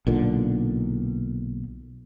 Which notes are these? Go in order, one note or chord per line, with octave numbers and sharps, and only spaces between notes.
B1 A#2 D3